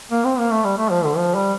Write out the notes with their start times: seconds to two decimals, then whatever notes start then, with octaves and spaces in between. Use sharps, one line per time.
0.11 A#3
0.24 C4
0.38 A#3
0.51 A3
0.65 G3
0.78 A3
0.91 F3
1.04 D3
1.16 F3
1.35 G3